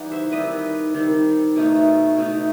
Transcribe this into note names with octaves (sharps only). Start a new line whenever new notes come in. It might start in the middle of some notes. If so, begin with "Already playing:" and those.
Already playing: E3 G3 D#4 F#5
C5 E5
D#3 G3 C4 B4 D#5
D#3 G3 C4
B2 A3 D#4
B2 A3 D#4